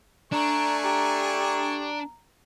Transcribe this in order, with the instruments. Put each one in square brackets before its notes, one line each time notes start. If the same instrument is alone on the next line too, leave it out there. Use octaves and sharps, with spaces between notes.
[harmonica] A3 G#5 C#6 [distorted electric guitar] D4 [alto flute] A#5
[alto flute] G4 [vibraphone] A#5